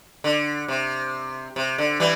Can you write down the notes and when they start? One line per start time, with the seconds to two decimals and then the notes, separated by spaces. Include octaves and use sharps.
0.24 D3
0.68 C3
1.56 C3
1.78 D3
2.00 E3 G3